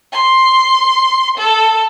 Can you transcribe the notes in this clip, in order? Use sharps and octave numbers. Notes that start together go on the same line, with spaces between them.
C6
A4